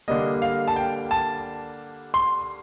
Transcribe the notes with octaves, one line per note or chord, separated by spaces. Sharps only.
D3 G3 A#3 D#5
F5
A5
G5
A5
C6